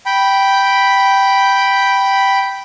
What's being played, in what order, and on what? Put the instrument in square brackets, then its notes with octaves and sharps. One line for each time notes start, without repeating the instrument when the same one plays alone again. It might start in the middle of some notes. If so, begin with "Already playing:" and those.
[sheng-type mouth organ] G5 B5